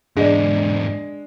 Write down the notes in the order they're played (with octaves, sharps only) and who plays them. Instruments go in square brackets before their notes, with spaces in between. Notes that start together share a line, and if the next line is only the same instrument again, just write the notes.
[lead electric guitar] E2 G#2 [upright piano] G#3 [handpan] D4 D5